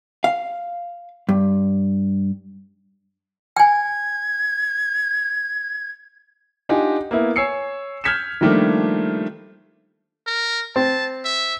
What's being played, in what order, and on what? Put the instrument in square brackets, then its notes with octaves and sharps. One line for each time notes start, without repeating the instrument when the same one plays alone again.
[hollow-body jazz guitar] F5
G2
[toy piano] G5 G#5 [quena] G#6
[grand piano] D4 D#4 F4 G4 F#5 G#5
A#3 B3 E4 E5
C#5 G#5 E6 C7 C#7
F6 G6 G#6 B6 C#7 E7
D#3 F3 G3 A3 A#3 D4
[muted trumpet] A#4
[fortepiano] C4 [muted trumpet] A5
[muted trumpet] E5